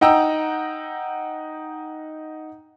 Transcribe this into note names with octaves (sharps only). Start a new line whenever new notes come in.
D#4 D#5 F#5 G5 A#5 E6